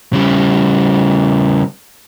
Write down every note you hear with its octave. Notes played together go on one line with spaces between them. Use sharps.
C#3 G3